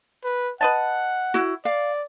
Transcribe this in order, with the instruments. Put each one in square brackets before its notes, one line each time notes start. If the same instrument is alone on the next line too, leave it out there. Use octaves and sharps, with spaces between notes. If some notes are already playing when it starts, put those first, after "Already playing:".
[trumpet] B4
[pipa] B4 D#5 A5 [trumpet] F#5
[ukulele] E4 F#4
[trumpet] D5 [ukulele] F5